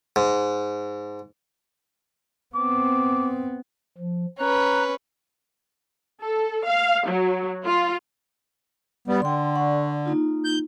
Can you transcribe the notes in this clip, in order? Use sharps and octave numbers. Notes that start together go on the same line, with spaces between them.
G#2
B3 C4 D6
F3
C#4 B4 A#5 F#6
A4
F5
F#3
F4
G2 G3 B3 D5
D3 G5 C6
D5 F#5 C#6
A#3 D#4 F4
G6